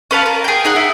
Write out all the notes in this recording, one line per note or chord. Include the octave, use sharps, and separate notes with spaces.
C#4 B4 F5 A5
A#4
G#4 G5
D#4 G#4 F#5
E4